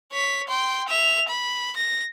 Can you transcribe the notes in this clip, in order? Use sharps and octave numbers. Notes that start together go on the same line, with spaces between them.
C#5 B6
G5 C6
E5 F7
B5
A#6